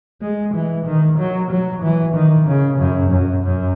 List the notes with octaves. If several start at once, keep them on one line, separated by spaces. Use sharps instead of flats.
G#3
E3
D#3
F#3
F#3
E3
D#3
C#3
F#2
F#2
F#2